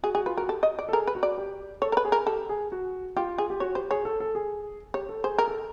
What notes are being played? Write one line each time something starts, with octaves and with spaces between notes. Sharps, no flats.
F#4 G#4
F#4 G#4
F4 B4
F#4 A#4
G4 A4
D#5
D5
A4
G#4 A#4
B4
F#4
D5
G4
A4 C#5
A#4
B4
G#4
A#4
G4 A4
G#4
F#4
F4 G4
G#4
G4
F#4 C#5
G4 C5
G#4 C#5
A4
A4
G#4
G4 C#5
A4
G#4 C5
G#4 A#4
A4